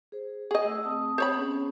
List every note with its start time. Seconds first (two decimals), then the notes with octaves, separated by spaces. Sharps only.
0.12 G#4 C5
0.51 G#4 D#5 F#5
0.65 A3 E6
0.84 C4 A5 D#6
1.18 C5 C#5 B5
1.35 B3 C#4 G#4